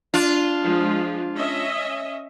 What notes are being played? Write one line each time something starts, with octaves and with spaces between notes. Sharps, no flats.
D4 F4
F3 G#3
C#4 D#5 E5